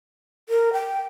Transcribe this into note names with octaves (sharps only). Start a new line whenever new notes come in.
A#4
G5